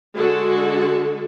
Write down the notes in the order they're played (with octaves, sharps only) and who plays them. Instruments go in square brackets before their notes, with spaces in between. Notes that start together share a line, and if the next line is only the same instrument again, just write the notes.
[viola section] D3 G#3 F#4 A4